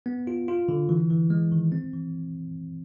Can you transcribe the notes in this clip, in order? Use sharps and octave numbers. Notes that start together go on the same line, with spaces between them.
B3
F4
F4
D3
E3
E3
G#3
D#3
C4
E3